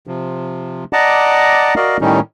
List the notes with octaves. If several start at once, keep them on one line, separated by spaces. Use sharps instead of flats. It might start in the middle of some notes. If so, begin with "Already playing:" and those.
C3 F3
D5 D#5 F#5 A5 A#5 D6
F#4 A#4 D5 D#5 F5
A2 D#3 G3 C#4 D#4